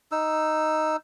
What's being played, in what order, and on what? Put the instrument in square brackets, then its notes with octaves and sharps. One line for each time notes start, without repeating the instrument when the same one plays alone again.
[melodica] D#4 E6